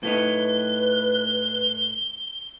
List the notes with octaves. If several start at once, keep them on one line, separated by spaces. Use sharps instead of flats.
A2 A3 D#4 B4 G7